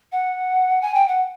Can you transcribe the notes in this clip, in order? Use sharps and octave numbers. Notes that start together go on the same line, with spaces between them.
F#5
G#5
G5
F#5